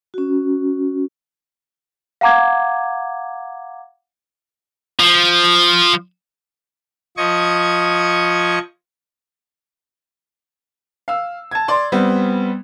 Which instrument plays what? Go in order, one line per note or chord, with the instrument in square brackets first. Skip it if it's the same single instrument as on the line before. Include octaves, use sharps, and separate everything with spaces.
[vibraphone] C#4 F#4
[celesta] F5 F#5 A#5 D6 G#6
[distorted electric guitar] F3
[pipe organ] F3 D#5 C#6 G#6
[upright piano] F5 E6
A5 G#6
D5 C6
G3 B3 C4